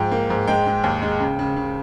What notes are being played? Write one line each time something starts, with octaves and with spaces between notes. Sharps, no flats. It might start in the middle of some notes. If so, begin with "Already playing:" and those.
Already playing: G#2 F3 G5
A#3
G#2
G#3 G5
G#3
D#2
G#3
C#3
C#3
C#3